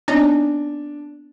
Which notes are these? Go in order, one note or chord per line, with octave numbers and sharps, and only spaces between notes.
B3 C4 D4 D#4 C#5